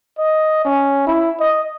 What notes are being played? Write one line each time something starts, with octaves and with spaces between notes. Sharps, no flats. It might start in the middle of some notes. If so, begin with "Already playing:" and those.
D#5
C#4
E4
D#5